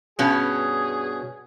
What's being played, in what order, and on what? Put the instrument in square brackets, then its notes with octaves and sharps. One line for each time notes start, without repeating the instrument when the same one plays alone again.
[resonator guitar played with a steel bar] G2 B2 C#4 [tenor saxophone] G#4